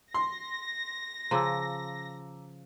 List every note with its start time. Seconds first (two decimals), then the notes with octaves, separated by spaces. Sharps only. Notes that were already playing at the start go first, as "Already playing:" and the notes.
0.14 C6 A#6
1.31 C#3 F3 A#5 D6 E6